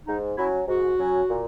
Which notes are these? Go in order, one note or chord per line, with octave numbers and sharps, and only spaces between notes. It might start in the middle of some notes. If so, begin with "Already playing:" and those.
G#2 D#4
F#3 C#4 E4
G#2 F#4
F#3 C#4
A#2